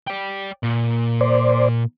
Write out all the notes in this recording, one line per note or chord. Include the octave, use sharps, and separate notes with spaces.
D5 G5
A#2
C5 D5